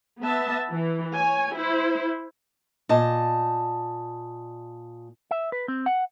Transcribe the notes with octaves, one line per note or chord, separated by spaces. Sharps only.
B3 E5 A5
E3
C#5 G#5
E4 C5
A#2 D#5 A5
E5
B4
C4
F#5